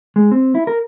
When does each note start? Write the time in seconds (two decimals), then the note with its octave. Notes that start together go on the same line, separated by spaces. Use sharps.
0.16 G#3
0.31 C4
0.55 E4
0.67 A#4